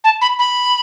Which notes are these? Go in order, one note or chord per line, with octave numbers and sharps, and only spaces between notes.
A5
B5
B5